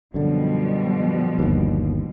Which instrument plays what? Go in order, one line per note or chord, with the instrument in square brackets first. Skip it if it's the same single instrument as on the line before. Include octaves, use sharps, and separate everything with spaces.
[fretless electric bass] F#2 D3 [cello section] B2 F3 G3
[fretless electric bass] G1 D#2